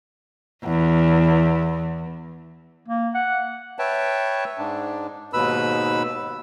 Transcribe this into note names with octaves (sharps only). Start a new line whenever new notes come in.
E2
A#3
F#5
B4 C#5 E5 G5 A5
G#2 D4
D#2 G#2 B2 B4 B5 E6